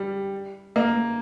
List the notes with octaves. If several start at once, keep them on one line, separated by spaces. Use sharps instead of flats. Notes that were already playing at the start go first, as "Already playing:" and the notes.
Already playing: G3
A#3